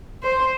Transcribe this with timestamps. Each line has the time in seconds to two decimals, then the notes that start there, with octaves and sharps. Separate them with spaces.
0.23 C5